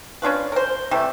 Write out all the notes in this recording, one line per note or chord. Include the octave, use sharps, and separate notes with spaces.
C#4 D4 F4 B4
A#4 C5
C3 E3 G3 A3